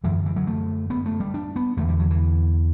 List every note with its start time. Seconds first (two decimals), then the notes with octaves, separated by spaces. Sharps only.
0.04 F#2 D3 E3
0.26 E3
0.36 F#3
0.47 A3
0.90 B3
1.06 A3
1.20 G3
1.34 D4
1.56 B3
1.77 E2 D3 A3
1.89 G3
2.00 F#3
2.11 E3